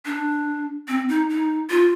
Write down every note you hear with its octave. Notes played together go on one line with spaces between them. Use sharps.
D4
C4
D#4
D#4
F4